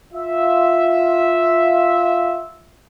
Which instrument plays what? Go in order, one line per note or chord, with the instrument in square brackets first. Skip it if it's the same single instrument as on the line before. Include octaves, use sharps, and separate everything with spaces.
[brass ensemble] F4 E5